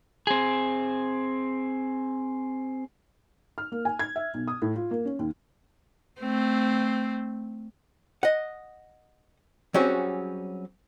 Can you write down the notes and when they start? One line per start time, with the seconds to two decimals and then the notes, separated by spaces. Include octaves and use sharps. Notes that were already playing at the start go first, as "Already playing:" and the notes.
0.27 C4 G#4
3.58 F6
3.72 A#3
3.85 G#5
3.99 G#6
4.16 E5
4.34 B1
4.48 D#6
4.62 A2
4.76 F4
4.91 A#3
5.05 C#4
5.19 D#2
6.20 A3 C4
8.23 D#5 F#5
9.74 F#3 G3 C4 C#4 F#4 G#4